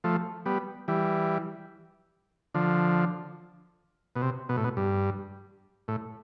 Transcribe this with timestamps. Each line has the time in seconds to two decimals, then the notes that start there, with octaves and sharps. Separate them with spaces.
0.04 F3 A3
0.46 G3 B3
0.88 E3 G3
2.54 D3 F3
4.16 B2
4.22 C3
4.49 B2
4.57 A2
4.64 B2
4.77 G2
5.88 A2